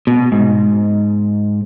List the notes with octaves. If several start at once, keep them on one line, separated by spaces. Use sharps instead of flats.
B2
G#2